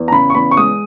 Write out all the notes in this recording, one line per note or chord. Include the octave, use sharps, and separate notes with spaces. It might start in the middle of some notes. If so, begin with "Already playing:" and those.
Already playing: E2
A#5
C#3 B5
C#6
E2 B5
C#6
G#3 D#6